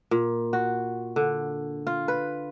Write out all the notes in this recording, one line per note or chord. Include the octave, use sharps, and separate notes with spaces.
A#2
F#4
D3
F4
B4